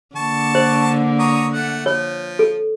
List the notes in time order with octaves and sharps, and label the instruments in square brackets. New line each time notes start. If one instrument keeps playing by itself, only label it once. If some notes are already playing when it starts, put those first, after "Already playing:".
[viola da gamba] D3 A#3 [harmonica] A5 C#6
[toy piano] C5
[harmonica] C#5 A#5 D#6
A3 F#5
[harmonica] F3 [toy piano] C#5
[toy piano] A4